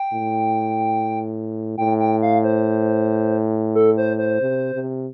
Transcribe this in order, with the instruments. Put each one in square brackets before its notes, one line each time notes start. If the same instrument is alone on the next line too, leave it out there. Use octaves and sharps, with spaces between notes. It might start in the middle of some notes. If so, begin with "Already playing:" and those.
Already playing: [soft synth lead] G5
[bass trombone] A2
[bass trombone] A2 [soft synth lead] G5
[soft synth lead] G5
F5
C5
A4
C5
C5
[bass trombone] C3
C3